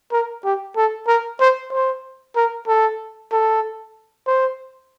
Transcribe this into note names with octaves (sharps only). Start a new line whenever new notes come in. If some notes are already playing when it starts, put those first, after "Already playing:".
A#4
G4
A4
A#4
C5
C5
A#4
A4
A4
C5